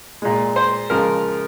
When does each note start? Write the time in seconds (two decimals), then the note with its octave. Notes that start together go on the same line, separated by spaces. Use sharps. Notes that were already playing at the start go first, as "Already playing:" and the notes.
0.22 A#2 G#3
0.56 C5
0.90 C#3 F3 G#3 A#4